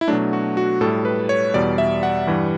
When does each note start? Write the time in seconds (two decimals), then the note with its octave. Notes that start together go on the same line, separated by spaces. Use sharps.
0.01 E4
0.08 B2 F#3 A3 D4
0.33 F#4
0.57 F#4
0.81 A2 A4
0.85 G3
1.05 B4
1.29 C#5
1.54 E2 B2 G3 D5
1.78 E5
2.03 F#5
2.27 G2 E3 G3